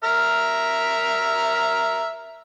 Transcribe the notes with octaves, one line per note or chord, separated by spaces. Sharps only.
A#4 E5 F6